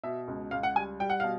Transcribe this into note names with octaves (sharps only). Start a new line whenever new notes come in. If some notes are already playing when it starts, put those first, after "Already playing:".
B2 E5
C#2
C#2 F5
F#5
G3 G#5
G3 G5
F#5
B2 F5